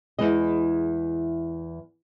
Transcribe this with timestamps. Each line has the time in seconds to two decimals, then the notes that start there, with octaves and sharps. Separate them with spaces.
0.19 E2 D#3 E3 G#3 D#5